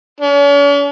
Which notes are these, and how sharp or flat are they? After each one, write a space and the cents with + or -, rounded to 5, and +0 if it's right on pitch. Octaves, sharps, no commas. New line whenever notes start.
C#4 +45